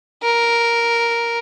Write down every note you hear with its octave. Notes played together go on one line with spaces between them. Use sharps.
A#4